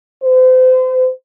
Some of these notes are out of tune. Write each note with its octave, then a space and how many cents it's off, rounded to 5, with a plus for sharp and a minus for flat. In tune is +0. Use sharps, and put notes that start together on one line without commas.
C5 -35